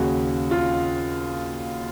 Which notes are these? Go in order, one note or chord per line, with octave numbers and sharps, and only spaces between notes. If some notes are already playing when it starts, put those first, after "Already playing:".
Already playing: D#2 C#3 F#4
F4